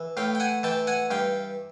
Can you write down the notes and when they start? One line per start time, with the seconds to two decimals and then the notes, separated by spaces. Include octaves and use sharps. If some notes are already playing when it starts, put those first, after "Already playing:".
Already playing: E3
0.17 A2 F5 G5
0.35 G5
0.40 F#5 G#5
0.63 E3 G5 A5
0.87 F#5 G#5
1.11 G2 F5 G5